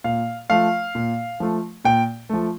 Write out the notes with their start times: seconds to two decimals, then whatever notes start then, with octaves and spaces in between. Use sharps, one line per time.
0.04 A#2 F5
0.50 F3 A3 F5
0.95 A#2
1.40 F3 A3
1.84 A#2 G5
2.29 F3 A3